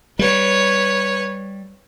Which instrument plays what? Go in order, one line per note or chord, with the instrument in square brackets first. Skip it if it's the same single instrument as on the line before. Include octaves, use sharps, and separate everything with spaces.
[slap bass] G3 [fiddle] B4 C#5